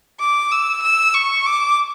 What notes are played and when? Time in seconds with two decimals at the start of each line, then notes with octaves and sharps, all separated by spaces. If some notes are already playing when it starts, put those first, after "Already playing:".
0.20 D6
0.51 E6
0.82 E6
1.14 C#6
1.46 D6